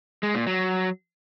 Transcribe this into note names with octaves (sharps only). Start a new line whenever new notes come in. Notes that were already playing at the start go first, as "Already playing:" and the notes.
G#3
A#2
F#3